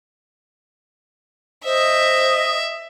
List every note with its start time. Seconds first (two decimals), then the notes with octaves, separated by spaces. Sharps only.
1.65 C5 D#5 E5